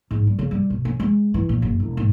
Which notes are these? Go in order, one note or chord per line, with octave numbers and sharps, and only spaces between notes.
G#2
G3
C#3
G3
B2
C#4
G#3
E3
A#2
F#1
E1
G#2